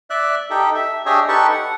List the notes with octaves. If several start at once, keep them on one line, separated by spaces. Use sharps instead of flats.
D5 E5 F#6
D#4 G4 A4
E5
D4 G4 G#4 C#5 D#5 E5
D#4 G4 A4 B4 A5 C#6
F#5